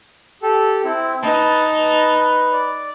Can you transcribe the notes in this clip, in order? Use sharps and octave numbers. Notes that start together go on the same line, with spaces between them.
G4 A4
C4 E4
D#4 B4 A5
B4
D5